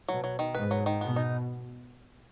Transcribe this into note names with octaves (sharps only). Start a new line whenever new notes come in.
B2 F#3
F#3
D#3
G#2 B4
F#3
D#3
B2 B3
D#4